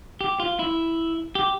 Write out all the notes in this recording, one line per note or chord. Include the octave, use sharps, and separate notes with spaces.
G4
F4
E4
G4